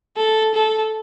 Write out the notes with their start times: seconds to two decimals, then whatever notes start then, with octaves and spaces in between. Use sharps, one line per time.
0.17 A4
0.54 A4